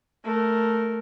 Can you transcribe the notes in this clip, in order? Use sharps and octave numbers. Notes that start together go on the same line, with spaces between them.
A3 A#4